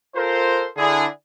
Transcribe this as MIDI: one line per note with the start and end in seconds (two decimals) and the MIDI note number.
0.16 0.65 65
0.16 0.65 69
0.16 0.65 70
0.16 0.65 72
0.77 1.05 50
0.77 1.05 62
0.77 1.05 64
0.77 1.05 68